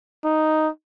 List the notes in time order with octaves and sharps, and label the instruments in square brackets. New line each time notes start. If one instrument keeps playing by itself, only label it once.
[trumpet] D#4